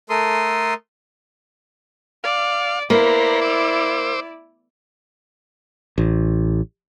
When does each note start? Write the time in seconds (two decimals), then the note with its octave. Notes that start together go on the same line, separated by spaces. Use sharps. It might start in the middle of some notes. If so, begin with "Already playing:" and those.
0.10 A3 A4 A#4 C6 D#6
2.24 D5 F5
2.90 A#3 E4 B4 C5 D5 A#5
3.42 C5 D6 E6
5.98 A1